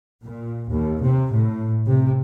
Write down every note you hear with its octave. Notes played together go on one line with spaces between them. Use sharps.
A#2
D#2
C3
A2
C3